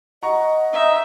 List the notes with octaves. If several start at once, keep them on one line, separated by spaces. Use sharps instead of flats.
D#5 F#5 A#5 C#6
D#4 E5